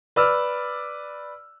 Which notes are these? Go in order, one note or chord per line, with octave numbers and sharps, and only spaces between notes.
B4 D5 E6 F6